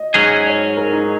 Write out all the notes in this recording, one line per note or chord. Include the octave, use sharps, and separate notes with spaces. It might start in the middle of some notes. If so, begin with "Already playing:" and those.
Already playing: D#5
G#2 F#3 C#4 G#4
C#5
A#4
D#4